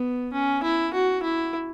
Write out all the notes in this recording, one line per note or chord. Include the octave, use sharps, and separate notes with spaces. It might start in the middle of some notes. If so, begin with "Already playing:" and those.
Already playing: B3
C#4
E4
F#4
E4